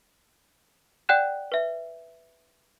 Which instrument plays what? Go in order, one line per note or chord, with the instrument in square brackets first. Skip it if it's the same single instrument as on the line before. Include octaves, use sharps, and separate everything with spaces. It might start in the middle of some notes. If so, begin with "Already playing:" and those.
[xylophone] D5 F#5 G5 F#6 E7
B4 E5